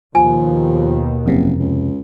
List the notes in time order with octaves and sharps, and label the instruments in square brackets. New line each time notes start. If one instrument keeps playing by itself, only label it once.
[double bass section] D#2 B2 D#3 [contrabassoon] F3 [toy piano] G#5
[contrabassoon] F#1 [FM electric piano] F2 C3
[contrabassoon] C#2